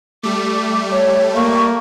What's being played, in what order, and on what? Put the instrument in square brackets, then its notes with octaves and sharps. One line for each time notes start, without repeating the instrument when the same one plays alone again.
[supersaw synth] G3 A3 [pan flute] D6
[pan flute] C#5
[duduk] A#3 [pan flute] C#6